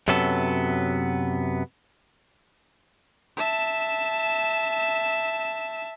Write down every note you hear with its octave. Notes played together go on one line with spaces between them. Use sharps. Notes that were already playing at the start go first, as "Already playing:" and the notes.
F#2 C3 F#3 B3 A4
E5 A5